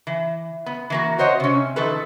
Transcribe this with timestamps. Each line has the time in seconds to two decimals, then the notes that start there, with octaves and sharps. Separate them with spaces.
0.07 E3
0.66 B3
0.90 E3 A#3 F#4
1.18 F#4 C5 C#5 D#5
1.40 C3 C#4
1.76 D#3 F3 A3 A4 B4